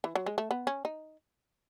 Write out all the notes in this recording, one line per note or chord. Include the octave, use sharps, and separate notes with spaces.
E3
F#3
G#3
A3
B3
C#4
D#4